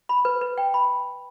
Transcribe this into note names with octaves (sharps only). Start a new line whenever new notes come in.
B5
B4
B4
G5
B5